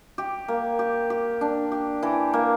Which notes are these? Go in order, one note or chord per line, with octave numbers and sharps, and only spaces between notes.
G4
A#3
G4
G4
D4
G4
E3
A#3